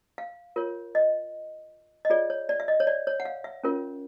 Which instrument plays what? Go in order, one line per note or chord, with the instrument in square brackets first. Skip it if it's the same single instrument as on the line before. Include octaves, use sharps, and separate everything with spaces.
[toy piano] F5
F4 A#4 C#5
D#5
D#5
F4 G#4 C#5 D5
C#5
D5
E5
D#5
C#5
D5
C#5
F#5
F5
E5
C#4 F4 A#4 C#5